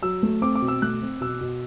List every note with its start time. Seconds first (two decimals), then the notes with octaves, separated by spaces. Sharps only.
0.03 F#3 E6
0.23 A3
0.42 C4 D6
0.55 D6
0.62 B2
0.68 E6
0.82 A3 F#6
1.02 C4
1.21 B2 E6
1.41 B2